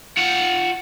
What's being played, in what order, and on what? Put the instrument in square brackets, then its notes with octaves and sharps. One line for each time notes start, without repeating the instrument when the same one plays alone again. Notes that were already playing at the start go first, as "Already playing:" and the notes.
[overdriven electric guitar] F4 F#5